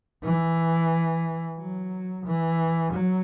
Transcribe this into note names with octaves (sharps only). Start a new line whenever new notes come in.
E3
F#3
E3
F#3